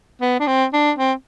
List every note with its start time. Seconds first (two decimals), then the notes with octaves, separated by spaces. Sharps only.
0.21 B3
0.40 D4
0.47 C4
0.73 D4
0.99 C4